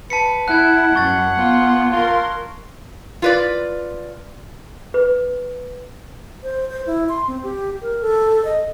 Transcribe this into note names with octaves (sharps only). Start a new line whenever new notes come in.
B4 A5 B6 C#7
E4 F#5 F#6 G#6
F#2 C#6 A6
B3 F4
F4 A#4 C6
F4 B4 D5
B4
C5
C5
E4
C6
C4
G4
A#4
A4
D#5